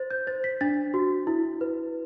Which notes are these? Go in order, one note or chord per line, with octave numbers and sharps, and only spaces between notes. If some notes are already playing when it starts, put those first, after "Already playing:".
Already playing: C5 A6
G6
C5 A6
B6
D4 A6
F#4
E4
B4